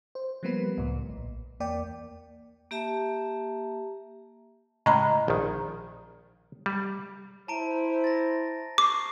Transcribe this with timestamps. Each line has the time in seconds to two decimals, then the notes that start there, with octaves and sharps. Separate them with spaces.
0.15 C5
0.43 F3 G3 A#3 B3 B4
0.78 C#2 A2
1.09 A#1
1.60 E2 A#3 D5 G5
2.71 A#3 G4 E5 A5 A#5
4.86 A2 C#3 G#3 D#5 A#5 B5
5.28 A#1 D#3
6.66 G3
7.48 E4 C5 A5 A#5 D7
8.04 A6 A#6
8.78 C#6 D6 C7